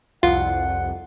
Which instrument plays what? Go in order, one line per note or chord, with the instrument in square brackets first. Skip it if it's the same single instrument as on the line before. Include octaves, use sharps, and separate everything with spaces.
[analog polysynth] C2 F2 [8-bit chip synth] F4 [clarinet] F#5